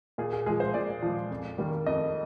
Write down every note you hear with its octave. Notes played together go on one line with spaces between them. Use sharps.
A#2 G#4
G#4
F3 G#3 G#4
C5
A#2 D5
F3 G#3
F2
D#3 G3 A#3
F2 D#5